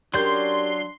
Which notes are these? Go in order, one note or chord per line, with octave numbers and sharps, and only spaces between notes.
F#3 C#4 D4 G4 A#4 D5 C6 G6